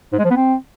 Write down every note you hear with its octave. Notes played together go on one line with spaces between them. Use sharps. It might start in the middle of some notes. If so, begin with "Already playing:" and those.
G#2
G#3
F3
B3
C4